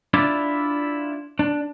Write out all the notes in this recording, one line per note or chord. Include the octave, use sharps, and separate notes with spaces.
D4 E4 F4 D5 E5
D4